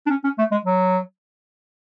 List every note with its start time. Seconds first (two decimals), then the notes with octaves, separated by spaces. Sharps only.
0.06 D4
0.10 C#4
0.24 C#4
0.38 A3
0.51 G#3
0.65 F#3